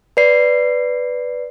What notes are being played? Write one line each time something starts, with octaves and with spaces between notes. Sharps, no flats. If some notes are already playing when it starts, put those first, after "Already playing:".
B4 D5 C7